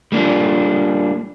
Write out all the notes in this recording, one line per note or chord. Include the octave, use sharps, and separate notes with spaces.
G3 A#3 C#4 D4 F4